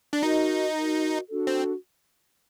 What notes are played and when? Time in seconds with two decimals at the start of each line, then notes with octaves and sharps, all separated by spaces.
0.13 D4
0.22 D#4 F#4 A#4 D#5
0.76 F#4 A#4 D#5
1.29 D4 F#4 A4
1.47 C4